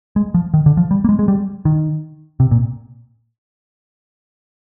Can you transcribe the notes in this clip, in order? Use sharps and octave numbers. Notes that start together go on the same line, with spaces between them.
G#3
F3
D#3
D3
F3
G3
A#3
G#3
G#3
G3
D#3
C3
A#2